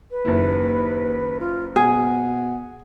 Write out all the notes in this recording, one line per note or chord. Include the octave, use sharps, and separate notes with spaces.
B4
F#1 D#2 E4
F4
B2 G#4 F#5